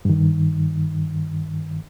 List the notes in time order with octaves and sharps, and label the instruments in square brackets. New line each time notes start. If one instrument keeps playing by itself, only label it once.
[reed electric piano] G2 D#3